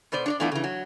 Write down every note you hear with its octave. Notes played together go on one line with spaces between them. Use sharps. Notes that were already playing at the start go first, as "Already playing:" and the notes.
B2 B3 C5 D5
D4 C#5 D5
E3 A3 B3 D4 E4 F4
C#3 E3
F#3